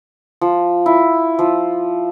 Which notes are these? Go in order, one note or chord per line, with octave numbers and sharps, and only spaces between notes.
F3
E4
F3